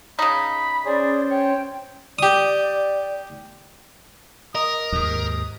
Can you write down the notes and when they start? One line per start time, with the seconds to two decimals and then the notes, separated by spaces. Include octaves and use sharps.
0.19 C#3 D#4 B5
0.86 C#4 G#4 C5 D5
1.30 C#5 G5
2.19 G4 D5 D#6
4.55 A#4 D#5 D#6
4.92 D#2 G#2 D#6